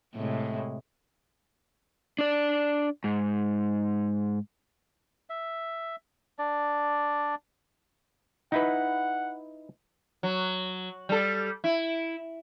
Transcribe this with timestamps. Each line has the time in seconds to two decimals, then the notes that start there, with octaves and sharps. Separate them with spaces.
0.15 A2 C3 G#3
2.19 D4 D5
3.04 G#2
5.30 E5
6.39 D4 D5
8.52 D#4 E4 B4 F#5
10.23 F#3
11.09 G3 A4
11.64 E4